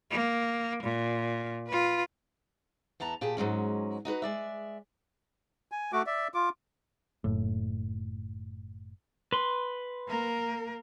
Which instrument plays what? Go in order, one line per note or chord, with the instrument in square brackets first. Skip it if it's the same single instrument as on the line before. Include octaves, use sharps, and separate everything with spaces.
[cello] A#3
A#2
F4 B4
[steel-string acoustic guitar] E2 B3 A5 A#5
A#2 G4 G#4 A5
G#2 F#3 G#3 C#4
D#4 F#4 A#4 B4
G#3 D5 E5
[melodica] G#5
A3 F#4 D6
D5 E5
F4 D6
[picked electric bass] F#1 A2
[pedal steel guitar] B4 C6
[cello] A#3 A#4